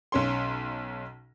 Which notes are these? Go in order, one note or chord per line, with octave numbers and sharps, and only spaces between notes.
B1 C#4 C6